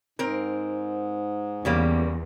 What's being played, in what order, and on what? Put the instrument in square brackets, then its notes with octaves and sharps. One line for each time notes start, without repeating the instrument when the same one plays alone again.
[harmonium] G#2 [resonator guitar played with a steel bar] C4 A#4
[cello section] E2 [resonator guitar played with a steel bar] C#3 G3 A#3